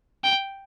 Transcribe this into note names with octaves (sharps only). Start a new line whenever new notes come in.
G5